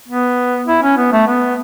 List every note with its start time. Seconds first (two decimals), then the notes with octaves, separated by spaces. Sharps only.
0.08 B3
0.67 E4
0.82 C#4
0.98 B3
1.13 A3
1.27 B3